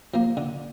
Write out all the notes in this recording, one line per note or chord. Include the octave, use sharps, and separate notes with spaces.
F3 A#3
D3